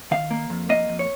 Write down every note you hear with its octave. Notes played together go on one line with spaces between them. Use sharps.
D#3 F5
A#3
F2
A#3 D#5
F2
C#5